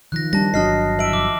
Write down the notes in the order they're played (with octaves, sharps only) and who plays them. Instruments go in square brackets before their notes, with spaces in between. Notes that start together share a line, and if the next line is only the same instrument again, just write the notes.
[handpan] D#3 F3 [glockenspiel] F#6 A#6
[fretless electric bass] G3 D4 [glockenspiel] A5 A#6
[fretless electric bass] G1 F#3 D4 [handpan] D#5 [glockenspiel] A5 F6 C7
[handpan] E5 [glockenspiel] D7 F#7
[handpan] F3 [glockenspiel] D6